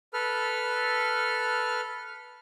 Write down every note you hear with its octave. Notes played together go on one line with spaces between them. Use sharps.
A4 B4 F6